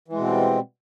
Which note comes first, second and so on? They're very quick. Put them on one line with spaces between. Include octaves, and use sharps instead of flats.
E3 G#3 B2 C4 G3